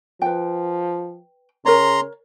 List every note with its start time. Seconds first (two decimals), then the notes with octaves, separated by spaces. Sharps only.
0.22 F3 B4 G5
1.66 C#3 A#4 C#5 A#5 C6